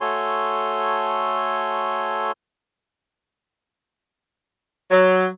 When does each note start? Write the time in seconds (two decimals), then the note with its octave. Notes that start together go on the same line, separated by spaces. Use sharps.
0.01 A3 F#4 A4 C#5 G#5 C6
4.90 F#3